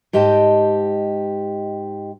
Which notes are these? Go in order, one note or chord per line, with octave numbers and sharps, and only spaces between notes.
G#2 G4 D#5 G5 A5